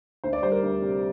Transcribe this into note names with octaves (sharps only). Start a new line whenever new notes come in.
D2 C5
D5
G3 C5
A#4
D2
C3